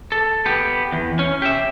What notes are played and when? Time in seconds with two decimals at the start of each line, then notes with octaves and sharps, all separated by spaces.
0.12 A4
0.46 B3 G4
0.92 E2
1.19 C#4
1.42 G4 E5